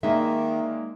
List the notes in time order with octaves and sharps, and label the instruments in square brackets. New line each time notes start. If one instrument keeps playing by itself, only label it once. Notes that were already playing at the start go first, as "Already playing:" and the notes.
[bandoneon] D#3 [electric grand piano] G#3 A#3 D5 [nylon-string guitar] D#4 E5